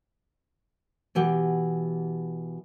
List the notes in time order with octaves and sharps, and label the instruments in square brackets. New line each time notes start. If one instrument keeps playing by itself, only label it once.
[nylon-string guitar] B2 E3 G4 F#5